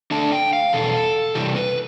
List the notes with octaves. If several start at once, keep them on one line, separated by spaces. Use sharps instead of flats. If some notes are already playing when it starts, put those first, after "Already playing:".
D3 A3 D4 A5
G5
F5
E2 B2 A4
C3 E3 G3 G4
B4